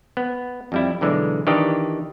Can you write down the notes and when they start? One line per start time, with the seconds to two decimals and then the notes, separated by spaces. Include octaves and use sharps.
0.17 B3
0.72 F2 G3 E4
1.01 B1 D3 E3 G#3
1.47 D#3 E3 D4 G4 D#5